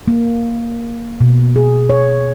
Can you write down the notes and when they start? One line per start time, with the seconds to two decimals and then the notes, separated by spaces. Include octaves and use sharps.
0.08 A#3
1.20 B2
1.56 G#4
1.90 C#5